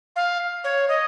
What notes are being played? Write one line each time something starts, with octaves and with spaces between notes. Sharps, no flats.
F5
C#5
D#5